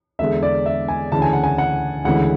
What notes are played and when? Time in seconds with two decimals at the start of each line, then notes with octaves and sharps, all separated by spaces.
0.19 E2 D3 G#3 E5
0.43 D5
0.66 E5
0.88 G#5
1.12 D2 C#3 E3 A5
1.22 G#5
1.33 F#5
1.44 G#5
1.58 F#5
2.05 D2 C#3 E3 G#3 F#5